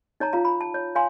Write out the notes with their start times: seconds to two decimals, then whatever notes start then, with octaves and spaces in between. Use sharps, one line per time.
0.20 D#4 C#5 A5 A#5
0.33 F4 F5 A#5
0.45 B5
0.61 A5
0.74 C#5
0.95 C#5 F5 G#5 C6